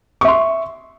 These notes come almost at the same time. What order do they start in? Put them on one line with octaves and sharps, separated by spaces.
C#6 E5 C6